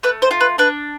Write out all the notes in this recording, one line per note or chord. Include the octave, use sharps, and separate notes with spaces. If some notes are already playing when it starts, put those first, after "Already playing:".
A3 B4
C5
F4
B4
D4 B4